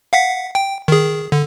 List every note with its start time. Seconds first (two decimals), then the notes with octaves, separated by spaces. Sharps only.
0.13 F5 F#5 B6
0.55 G5
0.88 D#3 G#4
1.32 D3